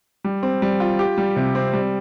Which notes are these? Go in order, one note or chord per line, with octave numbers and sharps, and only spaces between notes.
G3
C4
G3
F4
G4
G3
C3
C4
G3